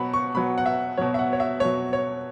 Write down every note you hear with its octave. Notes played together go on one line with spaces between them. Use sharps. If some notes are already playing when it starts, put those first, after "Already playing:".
Already playing: B2 F#3 F#5 B5
C#6
B2 F#3 B5
F#5
E5
B2 F#3 C#5
E5
F#5
C#5
E5
B2 F#3 C#5
C#5